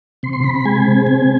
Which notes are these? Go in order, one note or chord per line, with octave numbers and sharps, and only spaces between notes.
C3 C6
C6
C3 B5
B5
G#3 G#5
C4
C3